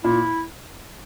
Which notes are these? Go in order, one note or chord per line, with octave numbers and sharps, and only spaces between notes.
A#2 E4